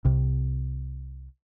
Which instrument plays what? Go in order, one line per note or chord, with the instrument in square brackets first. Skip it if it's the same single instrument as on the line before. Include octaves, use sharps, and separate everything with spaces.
[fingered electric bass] C2 C3